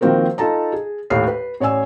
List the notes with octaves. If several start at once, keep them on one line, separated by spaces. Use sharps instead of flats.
D#3 F3 A#3 C4 F#4 A#4
D#4 F4 A4 A5 A#5
G#4
D#2 A2 F6 C7
B4
A1 C#5 D5 G#5 E6